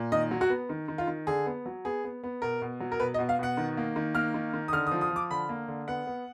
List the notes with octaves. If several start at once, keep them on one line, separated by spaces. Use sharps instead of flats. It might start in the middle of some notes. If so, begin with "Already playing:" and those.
Already playing: A#2
D#3 D#5
F#3
F#4
B3
D#3
D#3
F4
D#3
D3 G#4
B3
F#3
B3 G#4
B3
B3
B2 A#4
B2
F#3
A#4
B2 B4
D#5
B2
F5
B2 F#5
D#3
A#3
D#3
A#3 F6
D#3
D#3
D#6
D3 F6
D#6
F3
D#6
F3
D6
D3 B5
A#3
D3
B3 F#5
B3